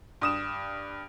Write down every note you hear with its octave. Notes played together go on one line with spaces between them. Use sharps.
G2 D#6 E7